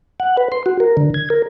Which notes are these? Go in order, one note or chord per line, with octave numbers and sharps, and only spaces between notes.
F#5
B4
C6
F#4
A#4
D3
G#6
A#4